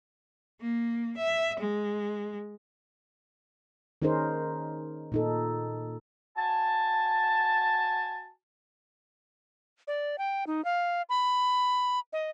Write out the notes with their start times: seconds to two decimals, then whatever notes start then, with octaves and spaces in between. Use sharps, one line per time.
0.61 A#3
1.17 E5
1.59 G#3
4.02 D#3 C#4 D#4 G#4 A#4 C5
5.12 A#2 D#4 A4
6.36 F#4 G#5 A5
9.87 D5
10.18 G5
10.47 D#4
10.65 F5
11.09 B5
12.13 D#5